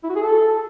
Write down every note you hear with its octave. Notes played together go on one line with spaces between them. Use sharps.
E4
F#4
G#4
A4